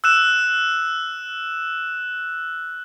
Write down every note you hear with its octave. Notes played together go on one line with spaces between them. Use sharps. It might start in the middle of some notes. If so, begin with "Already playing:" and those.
E6 F#6 E7